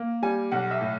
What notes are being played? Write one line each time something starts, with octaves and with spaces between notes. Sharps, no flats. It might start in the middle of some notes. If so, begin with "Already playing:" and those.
Already playing: A#3
G3 G#5
B1 F#5
E5
A2